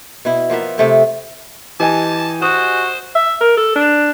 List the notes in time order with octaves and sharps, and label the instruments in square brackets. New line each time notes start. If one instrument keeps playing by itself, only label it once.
[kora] B2 E4
F3 A#3 B3 E5
C3 A3 C4
[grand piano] E3 [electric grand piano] G4 D#5 G#5 [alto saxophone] A5
[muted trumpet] F#4 [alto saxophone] C5 [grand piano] D#6
[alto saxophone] E5
A#4
A4
D4